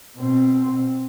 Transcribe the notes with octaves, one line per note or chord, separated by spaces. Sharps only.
B2 C4